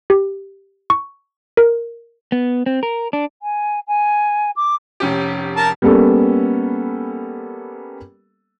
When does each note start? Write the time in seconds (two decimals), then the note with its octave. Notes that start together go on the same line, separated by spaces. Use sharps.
0.10 G4
0.90 C#6
1.57 A#4
2.32 B3
2.66 C4
2.83 A#4
3.13 D4
3.42 G#5
3.87 G#5
4.56 D6
5.00 F1 C#4 G4
5.57 A#4 A5
5.82 G3 A#3 B3 C#4 A4